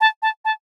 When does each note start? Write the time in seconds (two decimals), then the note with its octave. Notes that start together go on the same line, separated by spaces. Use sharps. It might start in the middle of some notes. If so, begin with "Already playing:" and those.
0.01 A5
0.22 A5
0.45 A5